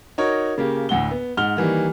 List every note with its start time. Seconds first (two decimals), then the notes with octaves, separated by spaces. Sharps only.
0.18 D#4 F#4 A#4 C#5
0.58 C#3 A#3 G4
0.89 D2 A2 F#5 G7
1.11 B3
1.37 G#2 F#5 F6 G7
1.57 D#3 E3 G3 A#3